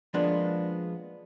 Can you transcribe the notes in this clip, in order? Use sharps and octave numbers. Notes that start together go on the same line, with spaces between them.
F3 G#3 A#3 B3 D4